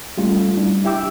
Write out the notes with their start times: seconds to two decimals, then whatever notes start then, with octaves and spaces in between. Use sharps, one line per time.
0.17 G3 A3 C#4 F4
0.57 G3 D4 E4
0.84 E4 G4 E5 G5 D6 E6